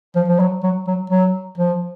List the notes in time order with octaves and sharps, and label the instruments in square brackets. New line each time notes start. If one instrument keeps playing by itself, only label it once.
[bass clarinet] F3
F3
F#3
F#3
F#3
F#3
F3